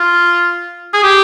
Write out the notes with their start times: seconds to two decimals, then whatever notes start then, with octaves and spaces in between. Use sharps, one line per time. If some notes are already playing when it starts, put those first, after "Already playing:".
Already playing: F4
0.94 G#4
1.03 G4